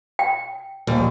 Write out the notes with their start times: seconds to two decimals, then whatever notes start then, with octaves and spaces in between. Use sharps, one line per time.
0.19 G5
0.87 A#1 D#2 G3